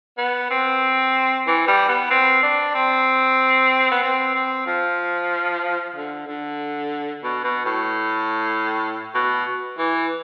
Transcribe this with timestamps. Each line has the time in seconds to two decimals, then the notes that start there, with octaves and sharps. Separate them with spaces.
0.18 B3
0.50 C4
1.47 E3
1.68 G3
1.89 B3
2.10 C4
2.43 D4
2.75 C4
3.92 B3
4.03 C4
4.35 C4
4.66 F3
5.95 D3
6.27 D3
7.23 B2
7.44 B2
7.65 A2
9.14 B2
9.78 E3